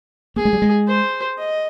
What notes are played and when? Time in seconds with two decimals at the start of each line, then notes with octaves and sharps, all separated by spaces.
0.36 A#3 G#4
0.45 G#3
0.53 G3
0.62 G#3
0.88 C5
1.38 D#5